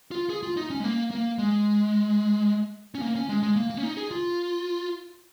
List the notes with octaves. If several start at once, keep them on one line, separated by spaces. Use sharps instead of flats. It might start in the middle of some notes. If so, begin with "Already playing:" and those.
F4
G#4
F4
D#4
C#4
G#3
A#3
A#3
G#3
C#4
A#3
C#4
G#3
G#3
A#3
A#3
C#4
D#4
G#4
F4